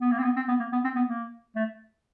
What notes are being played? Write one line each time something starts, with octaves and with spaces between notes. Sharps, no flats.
B3
A#3
C4
B3
C4
B3
A#3
B3
C4
B3
A#3
A3